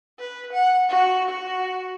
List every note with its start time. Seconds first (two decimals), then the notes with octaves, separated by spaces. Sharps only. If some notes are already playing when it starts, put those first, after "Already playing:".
0.19 B4
0.53 F#5
0.89 F#4
1.29 F#4